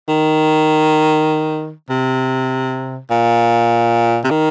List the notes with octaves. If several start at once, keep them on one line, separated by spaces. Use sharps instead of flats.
D#3
C3
A#2
C3
D#3